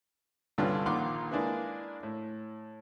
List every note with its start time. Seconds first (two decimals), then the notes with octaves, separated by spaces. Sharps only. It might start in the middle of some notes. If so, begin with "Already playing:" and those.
0.58 C2 G2 D3 C#4 F4 B4
0.86 A#1 D#3 F4 F#5 C6 D6
1.31 G#3 A#3 D4 E4 G#4 B4
2.03 A2